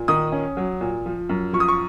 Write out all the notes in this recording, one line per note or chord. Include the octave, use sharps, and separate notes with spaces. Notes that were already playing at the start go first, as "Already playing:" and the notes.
Already playing: A#2
D#3 D#6
C#4
F#3
A#2
F3
F#2
F3 C#6
D#6
C#6